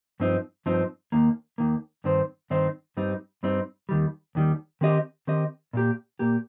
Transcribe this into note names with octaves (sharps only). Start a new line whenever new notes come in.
G2 F3 C4 D#4
G2 F3 C4 D#4
D#2 D#3 A#3
D#2 D#3 A#3
G2 D#3 C4 D#4 C5
G2 D#3 C4 D#4 C5
G2 G3 C4 D#4
G2 G3 C4 D#4
D#2 D#3 G3
D#2 D#3 G3
D#3 C4 G4 D#5
D#3 C4 G4 D#5
A#2 A#3 G4
A#2 A#3 G4